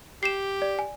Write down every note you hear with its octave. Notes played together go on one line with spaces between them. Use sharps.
G4 C7 E7
D5
G#5